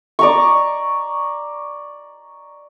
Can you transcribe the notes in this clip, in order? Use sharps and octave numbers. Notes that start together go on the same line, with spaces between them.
D5 A#5 C#6